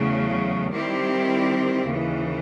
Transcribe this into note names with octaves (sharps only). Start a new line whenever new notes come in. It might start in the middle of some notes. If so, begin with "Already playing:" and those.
Already playing: E2 C#3 F#3 A3
D#3 G3 C4 E4 G4
D#2 C#3 E3